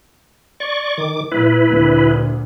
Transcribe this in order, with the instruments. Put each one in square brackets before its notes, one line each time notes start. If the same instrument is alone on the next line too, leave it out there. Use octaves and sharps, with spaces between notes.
[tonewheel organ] D5 C#6
D#3 D6
[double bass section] A#2 [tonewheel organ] E4 B4
[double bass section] D2 A#2